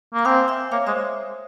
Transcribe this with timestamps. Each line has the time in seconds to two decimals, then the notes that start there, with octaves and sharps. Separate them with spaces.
0.14 A#3 A#5
0.25 C4 F5 G#5
0.48 E5 G5
0.72 A#3 C#5 F5
0.87 G#3 C5 E5